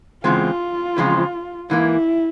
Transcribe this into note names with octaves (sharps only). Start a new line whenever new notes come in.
E2 C#3 G#3 C4 F4
E2 C#3 F3 G#3 C4
G#2 E3 A#3 E4